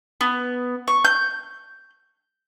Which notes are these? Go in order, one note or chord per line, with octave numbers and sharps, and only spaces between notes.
B3
C#6
G6